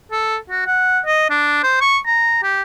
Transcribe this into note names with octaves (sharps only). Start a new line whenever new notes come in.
A4
F#4
F#5
D#5
D4
C5
C#6
A#5
G4